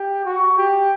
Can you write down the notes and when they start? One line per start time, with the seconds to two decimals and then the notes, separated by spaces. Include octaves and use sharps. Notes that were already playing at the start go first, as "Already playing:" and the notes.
Already playing: G4
0.25 F#4
0.57 G4